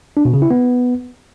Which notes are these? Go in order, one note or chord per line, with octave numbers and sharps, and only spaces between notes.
D4
B2
C#3
E4
B3